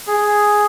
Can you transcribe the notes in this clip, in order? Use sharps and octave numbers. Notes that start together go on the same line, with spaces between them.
G#4